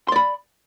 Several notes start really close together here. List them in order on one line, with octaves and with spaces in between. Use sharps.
C6 D5 B5